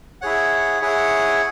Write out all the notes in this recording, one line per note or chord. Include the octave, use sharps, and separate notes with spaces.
E4 G#4 C#5 F#5
E4 G#4 C#5 F#5